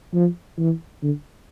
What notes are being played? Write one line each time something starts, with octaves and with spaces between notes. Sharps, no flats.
F3
E3
D3